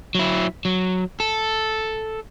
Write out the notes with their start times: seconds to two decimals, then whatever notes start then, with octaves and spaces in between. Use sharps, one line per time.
0.15 F#3 E4
0.65 F#3
1.20 A4